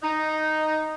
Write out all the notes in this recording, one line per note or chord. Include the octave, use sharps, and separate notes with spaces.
D#4